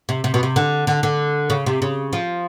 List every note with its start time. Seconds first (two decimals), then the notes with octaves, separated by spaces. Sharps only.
0.09 C3
0.24 C3
0.34 B2
0.43 C3
0.56 D3
0.87 D3
1.03 D3
1.50 C#3
1.66 C3
1.82 C#3
2.13 F3